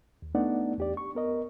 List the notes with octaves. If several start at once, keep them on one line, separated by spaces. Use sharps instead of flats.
D#2
A3 B3 D4 D#4 D5 F#5
E2 G4 D5
C#6
B3 A#4 D#5